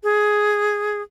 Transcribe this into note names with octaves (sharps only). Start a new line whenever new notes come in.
G#4